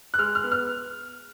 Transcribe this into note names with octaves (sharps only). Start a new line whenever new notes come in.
F#6
G#3 F6
F6
B3
F6